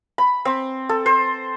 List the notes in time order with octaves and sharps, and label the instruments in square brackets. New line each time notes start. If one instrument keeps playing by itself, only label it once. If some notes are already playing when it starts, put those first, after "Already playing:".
[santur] B5
C4
A4
C5